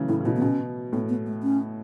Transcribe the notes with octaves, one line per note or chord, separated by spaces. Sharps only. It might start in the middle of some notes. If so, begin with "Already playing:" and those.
Already playing: C#3 E3 F#3 A3
A2 E4
C#3
B2 E4
B3
B2 C#4
A2 B3
B3
A3
C#4